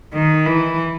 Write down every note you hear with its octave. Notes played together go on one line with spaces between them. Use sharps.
D#3
E3